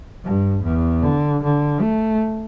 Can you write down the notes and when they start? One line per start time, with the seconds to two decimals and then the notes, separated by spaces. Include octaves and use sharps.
0.24 G2
0.63 E2
1.02 D3
1.43 D3
1.81 A3